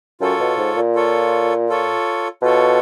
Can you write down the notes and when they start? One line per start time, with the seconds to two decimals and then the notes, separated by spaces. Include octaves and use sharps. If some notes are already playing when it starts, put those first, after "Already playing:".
0.21 F#2 F4 A4 C#5
0.40 B2
0.58 G#2
0.76 A#2
0.95 F4 A4 C#5
1.69 F4 A4 C#5
2.42 B2 F4 A4 C#5